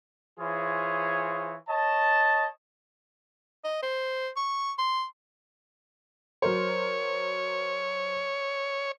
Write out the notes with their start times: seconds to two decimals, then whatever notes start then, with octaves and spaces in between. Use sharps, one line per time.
0.39 E3 F4 G#4 C5 C#5
1.69 C#5 D#5 A5
3.64 D#5
3.83 C5
4.37 C#6
4.78 C6
6.42 F#3 A#4 C5 C#5